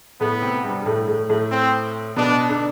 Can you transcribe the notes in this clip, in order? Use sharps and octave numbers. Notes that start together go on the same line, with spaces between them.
A2 A3 B3
C3 C4
G2 G3
G3
A2 A3
A2 A3
A2 A3
C4
B2 B3 D4
D3 D4